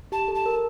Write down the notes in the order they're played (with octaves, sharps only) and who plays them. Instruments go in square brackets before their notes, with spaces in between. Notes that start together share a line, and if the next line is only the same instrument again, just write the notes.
[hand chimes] G4 [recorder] A5
[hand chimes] A4
[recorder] A5
[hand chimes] A#4